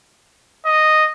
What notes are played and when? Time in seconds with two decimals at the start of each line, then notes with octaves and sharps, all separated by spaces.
0.66 D#5